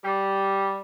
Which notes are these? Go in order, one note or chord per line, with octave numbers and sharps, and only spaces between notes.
G3